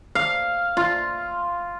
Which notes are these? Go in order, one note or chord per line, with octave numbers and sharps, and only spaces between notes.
F5
F4